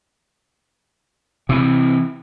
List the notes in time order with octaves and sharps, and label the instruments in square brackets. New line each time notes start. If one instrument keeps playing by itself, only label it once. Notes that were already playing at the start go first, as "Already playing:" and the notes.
[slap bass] C3 E3